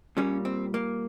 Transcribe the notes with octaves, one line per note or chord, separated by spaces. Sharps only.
A#2 G3 A#3 C#4
C4
A#3